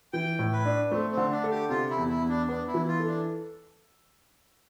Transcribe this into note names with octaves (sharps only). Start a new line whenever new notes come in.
E3 G5
A2
B4
D4
A3 C4
C4
D3
D4
A4
G4
C3 F4
E4
E2
E4
E2
D4
B3 D4
E4
E3
F4
A4
D4